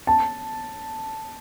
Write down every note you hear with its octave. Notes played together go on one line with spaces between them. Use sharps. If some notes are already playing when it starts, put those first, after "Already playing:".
A5